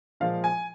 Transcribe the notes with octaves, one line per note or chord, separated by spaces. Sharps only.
A#2 F3 G#3 F5
G#5